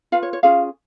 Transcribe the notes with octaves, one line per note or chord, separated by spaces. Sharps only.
F4 B4 F5
C#5
C#5
C#4 F4 G#4 F5